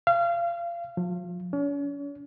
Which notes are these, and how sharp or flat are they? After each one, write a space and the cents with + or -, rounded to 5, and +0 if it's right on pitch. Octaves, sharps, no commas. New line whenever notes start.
F5 -30
F3 +35
C#4 +40